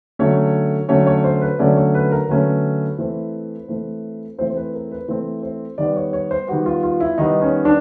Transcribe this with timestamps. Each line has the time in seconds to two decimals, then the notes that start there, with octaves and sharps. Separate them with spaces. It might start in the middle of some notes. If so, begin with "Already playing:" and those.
0.19 D3 F#3 A3 C#4 C#5
0.88 D3 F#3 A3 C#4 C#5
1.06 C#5
1.24 C5
1.41 B4
1.59 D3 F#3 A3 C#4 D5
1.76 C#5
1.95 B4
2.12 A#4
2.28 D3 F#3 A3 C#4 B4
2.99 E3 A3 C4
3.68 E3 A3 C4
4.38 E3 A3 C4 C5
4.50 C5
4.57 B4
4.74 A#4
4.92 B4
5.08 E3 A3 C4 C5
5.43 C5
5.78 D#3 G3 B3 D5
5.96 C#5
6.13 C#5
6.31 C5
6.48 D#3 G3 B3 F#4
6.66 F4
6.83 F4
7.00 E4
7.18 D#3 G3 B3 D#4
7.42 C#4
7.65 D4